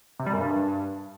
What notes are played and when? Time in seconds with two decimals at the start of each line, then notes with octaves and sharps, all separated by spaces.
0.19 C3
0.26 G3
0.33 F#2
0.40 G2